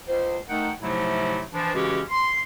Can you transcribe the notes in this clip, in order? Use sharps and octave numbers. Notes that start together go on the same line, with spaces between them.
C#2 C5
A3 D#4 A#4 F#5 G5
G#2 C3 F3 F#3 A3 E4
E3 F3 D4
C#3 E3 G#3 C#4 F#4 G4
C6